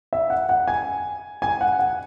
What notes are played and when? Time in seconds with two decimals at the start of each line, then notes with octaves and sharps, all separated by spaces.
0.13 E5
0.30 F#5
0.49 F#5
0.68 G#5
1.42 G#5
1.61 F#5
1.79 F#5